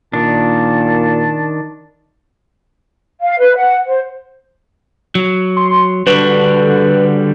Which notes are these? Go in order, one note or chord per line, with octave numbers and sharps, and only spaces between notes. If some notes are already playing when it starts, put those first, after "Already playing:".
A#2 D#3 D4 A5
F5
B4
F#5
C5
F#3
C6
D3 G3 D4 F#4 B4